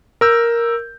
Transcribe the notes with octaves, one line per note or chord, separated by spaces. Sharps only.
A#4 E6 G6